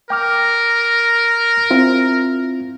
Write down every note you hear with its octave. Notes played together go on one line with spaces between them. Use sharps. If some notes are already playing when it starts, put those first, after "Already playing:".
A#4 G5 D6 F6
C4 E4 F4